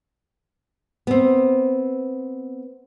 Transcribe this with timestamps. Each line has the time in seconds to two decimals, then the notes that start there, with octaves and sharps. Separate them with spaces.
1.07 B3 C4